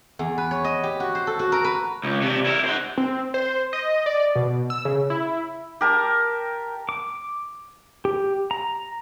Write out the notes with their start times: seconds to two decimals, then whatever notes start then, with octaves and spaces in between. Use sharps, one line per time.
0.19 E2
0.38 B4
0.51 C#5
0.64 D#5
0.84 G4
1.00 F#4
1.15 C5
1.27 A4
1.39 F#4
1.52 A#4
1.64 B4
2.04 C#2
2.22 C3 D4
2.46 E4 A#4
2.65 C5 F#5
2.98 C4
3.34 C5
3.73 D#5
4.06 D5
4.35 B2
4.70 E6
4.85 C#3
5.10 E4
5.81 G4 A#4 A5
6.89 D6
8.05 G4
8.51 A#5